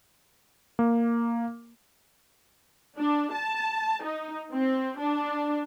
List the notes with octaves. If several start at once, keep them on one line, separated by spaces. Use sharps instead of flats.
A#3
D4
A5
D#4
C4
D4